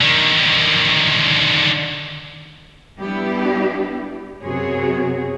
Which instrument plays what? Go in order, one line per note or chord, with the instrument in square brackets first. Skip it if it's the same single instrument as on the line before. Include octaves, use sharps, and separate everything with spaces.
[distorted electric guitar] D3 D#3
[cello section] G3 B3 D4 E4 G4
F#2 C3 B3 F#4 G#4 C#5